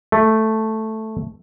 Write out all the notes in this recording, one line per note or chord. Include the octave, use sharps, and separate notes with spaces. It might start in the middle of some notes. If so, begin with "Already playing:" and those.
A3